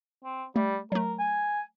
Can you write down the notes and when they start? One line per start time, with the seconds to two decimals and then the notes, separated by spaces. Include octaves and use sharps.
0.24 C4
0.56 G3 A3
0.92 F#3 A3 A#4
1.19 G#5